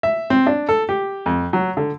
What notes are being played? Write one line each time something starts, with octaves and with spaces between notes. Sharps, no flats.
E5
C4
D4
A4
G4
F2
F#3
D3